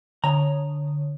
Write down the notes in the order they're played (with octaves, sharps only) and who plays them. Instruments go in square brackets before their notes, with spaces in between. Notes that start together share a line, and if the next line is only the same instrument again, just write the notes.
[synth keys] D3 C#5 D#6 [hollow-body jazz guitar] A#5